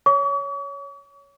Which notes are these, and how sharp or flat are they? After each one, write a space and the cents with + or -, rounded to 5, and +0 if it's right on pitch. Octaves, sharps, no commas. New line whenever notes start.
C#5 +10 C#6 +45